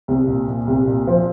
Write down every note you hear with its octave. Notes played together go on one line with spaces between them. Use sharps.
C2
A#2
A#2
C2
A#2
F3